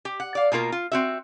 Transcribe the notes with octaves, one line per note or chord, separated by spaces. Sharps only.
G4
F#5
D5 F5
B2 A#3 F4 A#4
F4
C4 F#4 E5